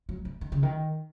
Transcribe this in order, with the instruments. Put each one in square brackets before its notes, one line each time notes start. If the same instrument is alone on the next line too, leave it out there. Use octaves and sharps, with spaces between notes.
[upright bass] F#3
F3
D#3
C#3
D#3